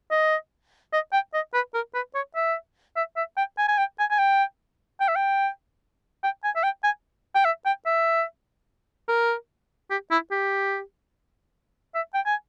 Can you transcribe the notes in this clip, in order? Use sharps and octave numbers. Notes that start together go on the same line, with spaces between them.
D#5
D#5
G5
D#5
B4
A#4
B4
C#5
E5
E5
E5
G5
G#5
G#5
G5
G#5
G#5
G5
G5
E5
G5
G5
G#5
E5
G5
G#5
G5
E5
G5
E5
A#4
G4
E4
G4
E5
G5
G#5